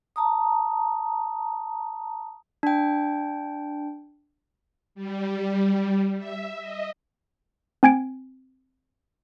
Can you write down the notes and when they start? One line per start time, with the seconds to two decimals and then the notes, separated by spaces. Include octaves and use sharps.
0.16 A5 A#5 D#6
2.63 D4 G5
4.95 G3
6.18 E5
6.60 D#5
7.83 C4 G#5 G#6 D7